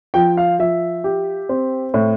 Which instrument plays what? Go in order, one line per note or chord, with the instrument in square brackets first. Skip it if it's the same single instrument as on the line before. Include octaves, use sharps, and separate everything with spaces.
[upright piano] F3 [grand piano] G5
[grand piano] F5
[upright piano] F3 [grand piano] E5
[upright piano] G4
C4
A2